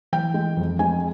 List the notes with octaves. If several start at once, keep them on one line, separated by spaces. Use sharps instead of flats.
E3 G5
G#3
F2
G#3 G#5